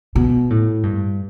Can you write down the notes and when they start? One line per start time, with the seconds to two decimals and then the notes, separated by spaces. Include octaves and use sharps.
0.16 B2
0.50 A2
0.83 G2